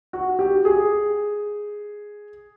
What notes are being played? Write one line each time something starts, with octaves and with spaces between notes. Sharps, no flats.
F#4
G4
G#4